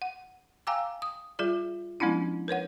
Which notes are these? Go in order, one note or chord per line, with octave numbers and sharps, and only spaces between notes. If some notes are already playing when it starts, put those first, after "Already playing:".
F#5
F5 G5 G#5 A#5 D6 E6
D#6
G3 F4 G#4 D5
F3 G#3 B3 C#4 D4 E4
A#4 B4 C#5 F#5